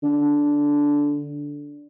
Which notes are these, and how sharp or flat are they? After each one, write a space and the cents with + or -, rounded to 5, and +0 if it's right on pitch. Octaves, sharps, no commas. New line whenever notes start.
D3 -10